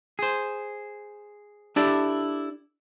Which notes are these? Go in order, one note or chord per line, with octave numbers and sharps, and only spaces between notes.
G#4 C5
D4 E4 G4 A4 D5